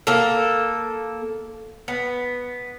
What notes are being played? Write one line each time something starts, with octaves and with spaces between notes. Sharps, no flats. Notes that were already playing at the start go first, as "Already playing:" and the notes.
A#3 A4
B3